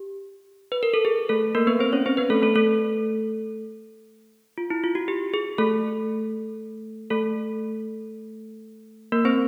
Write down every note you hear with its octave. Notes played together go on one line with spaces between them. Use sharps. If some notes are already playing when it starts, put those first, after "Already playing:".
Already playing: G4
B4
A#4
A4
G#4
A3 A4
A#3 A#4
B3 B4
C4 C5
C#4 C#5
C4 C5
B3 B4
A3 A4
A3 A4
A3 A4
F4
E4
F4
F#4
G4
G#4
A3 A4
A3 A4
A#3 A#4
C4 C5